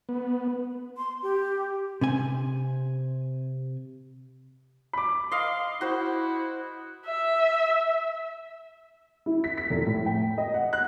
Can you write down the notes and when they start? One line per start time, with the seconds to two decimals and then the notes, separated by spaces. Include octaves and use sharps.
0.09 B3
0.98 C6
1.23 G4
2.01 C3 C4 G#5
4.93 B5 D6
5.31 D#5 F5 C6
5.81 E4 F#4 C5
7.06 E5
9.26 E4
9.44 B6
9.58 B6
9.70 F1
9.87 A2
10.06 G5
10.38 D#5
10.54 F#5
10.73 F#6